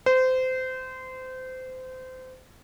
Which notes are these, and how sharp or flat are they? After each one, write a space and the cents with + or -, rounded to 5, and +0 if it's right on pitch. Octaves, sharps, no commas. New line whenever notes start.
C5 -25